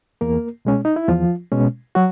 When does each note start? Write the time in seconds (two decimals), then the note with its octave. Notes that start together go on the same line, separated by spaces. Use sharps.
0.21 E2 A#3 A#4
0.65 B2 G#3 C#4
0.85 D#4
0.96 E4
1.08 E2 F3 F4
1.52 B2 G#3 C#4
1.95 F#3 F#4